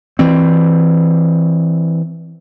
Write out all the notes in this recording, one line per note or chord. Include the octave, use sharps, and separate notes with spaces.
E3 C4